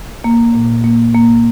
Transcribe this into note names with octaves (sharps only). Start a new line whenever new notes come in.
A#3
A#2
A#3
A#3